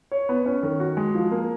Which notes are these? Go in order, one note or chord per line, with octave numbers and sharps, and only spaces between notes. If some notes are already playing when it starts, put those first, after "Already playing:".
C#5
B3
C#4
D#3
F#4
G#3
F3
A#3